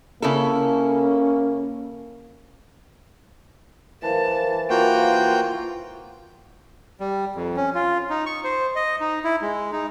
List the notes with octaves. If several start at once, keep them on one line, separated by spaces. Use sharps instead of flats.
C#3 A#3 C#4 E4 A4
E3 A#4 C5 F5 A5
A#3 F4 F#4 G5
G3
F2
C#4
F4
D#4
C#6
C5
D#5
D#4
E4
G#3
D#4